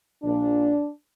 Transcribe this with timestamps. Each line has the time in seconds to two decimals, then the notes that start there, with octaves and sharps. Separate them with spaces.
0.23 A#1 A#2 D4